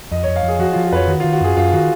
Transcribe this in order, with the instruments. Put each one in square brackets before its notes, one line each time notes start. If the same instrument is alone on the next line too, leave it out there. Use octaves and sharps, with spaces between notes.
[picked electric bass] F2 [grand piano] D#5
[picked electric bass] F2 [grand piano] C#5
[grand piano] F5
[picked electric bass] F2 [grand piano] G#4
[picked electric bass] F3 [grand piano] F#4
[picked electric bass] F3 [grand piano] F4
[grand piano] F#4
[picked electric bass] F2 [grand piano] B4
[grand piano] C#5
[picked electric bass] D#3 [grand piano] F#4
[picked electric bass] D#3 [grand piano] F4
[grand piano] F#4
[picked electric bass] F#2 [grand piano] G#4
[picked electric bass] F#2 [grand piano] F4
[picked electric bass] D#3 [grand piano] F#4